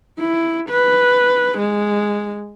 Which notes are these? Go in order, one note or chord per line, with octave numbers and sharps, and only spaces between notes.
E4
B4
G#3